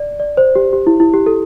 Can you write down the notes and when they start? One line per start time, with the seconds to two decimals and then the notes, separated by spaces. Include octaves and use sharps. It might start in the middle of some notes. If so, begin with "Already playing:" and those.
Already playing: D5
0.20 D5
0.37 C5
0.55 G4
0.73 G4
0.87 E4
1.00 E4
1.14 G4
1.26 A4